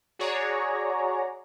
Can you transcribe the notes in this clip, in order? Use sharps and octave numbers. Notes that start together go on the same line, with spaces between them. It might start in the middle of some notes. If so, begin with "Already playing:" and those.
F#4 G#4 C#5 D5 A#5